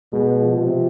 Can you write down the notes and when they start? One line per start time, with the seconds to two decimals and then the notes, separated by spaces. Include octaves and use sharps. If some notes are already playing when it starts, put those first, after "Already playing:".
0.13 B2 G#3
0.42 F3
0.57 C3
0.72 F3